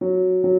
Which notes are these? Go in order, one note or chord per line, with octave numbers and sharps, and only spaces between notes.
F#3
F#3